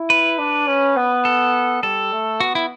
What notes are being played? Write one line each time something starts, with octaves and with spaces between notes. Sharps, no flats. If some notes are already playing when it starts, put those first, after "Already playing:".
Already playing: E4
B4
D4
C#4
B3
A4
G3 A4
A3
B3 F#4
E4